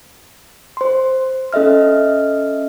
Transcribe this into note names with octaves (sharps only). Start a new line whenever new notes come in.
C5 C6
C#4 A4 D#5 E5 F6